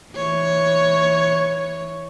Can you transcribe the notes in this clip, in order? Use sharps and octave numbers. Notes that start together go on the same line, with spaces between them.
E3 C#5